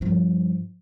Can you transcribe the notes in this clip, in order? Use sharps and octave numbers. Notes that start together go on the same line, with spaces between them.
G2 F3